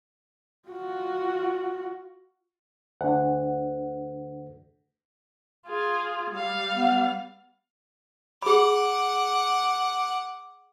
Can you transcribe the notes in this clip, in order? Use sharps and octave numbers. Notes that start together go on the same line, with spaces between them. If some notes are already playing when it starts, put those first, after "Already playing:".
F4 F#4
D2 D4 F#5
F4 G#4
G3 F5
B3
G#4 F#5 B5 D6